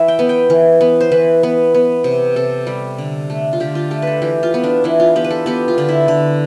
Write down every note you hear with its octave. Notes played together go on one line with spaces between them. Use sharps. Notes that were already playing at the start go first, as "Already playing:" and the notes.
Already playing: E3 B4 E5
G5
B3
G5
E3
B3
C5
E3 B4
B3
B3
C3
C3 A4
G3
D3
A3
F4
D3 G4
F4
A3 G4
A4 B4
E3 G4
F4
B3
D4
E3 E4
F4
B3 G4
B4
A4
B3 G4
F4
D3
E4
D3